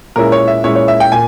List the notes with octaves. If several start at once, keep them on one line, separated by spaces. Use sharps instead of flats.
A#2 G#3 C#4 E4 A#4
C#5
E5
A#2 G#3 C#4 E4 C#5
C#5
E5
G5
A#2 G#5